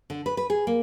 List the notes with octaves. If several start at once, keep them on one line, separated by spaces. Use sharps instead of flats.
D3
B4
B4
G#4
A#3